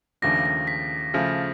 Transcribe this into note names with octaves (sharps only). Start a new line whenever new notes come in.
D#2 C#3 F3 A3 D4 A#6
A#6
B6
C#3 F3 A3